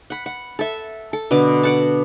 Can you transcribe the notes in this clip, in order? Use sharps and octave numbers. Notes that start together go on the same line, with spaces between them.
F#5 B5
F#5
A4 E5
A4
B2 D3 B4 D6
D5 F#5 A5